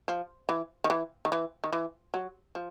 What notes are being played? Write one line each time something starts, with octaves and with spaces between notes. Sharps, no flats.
F3
E3
D#3
E3
D#3
E3
D#3
E3
F#3
F3